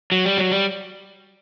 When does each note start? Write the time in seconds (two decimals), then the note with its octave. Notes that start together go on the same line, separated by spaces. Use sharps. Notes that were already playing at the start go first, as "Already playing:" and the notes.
0.12 F#3
0.25 G3
0.38 F#3
0.51 G3